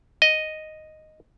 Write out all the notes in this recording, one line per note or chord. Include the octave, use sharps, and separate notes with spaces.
D#5